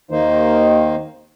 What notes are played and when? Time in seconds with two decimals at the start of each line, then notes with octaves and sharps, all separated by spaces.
0.11 D#2 D#3 A#3 D#4 C5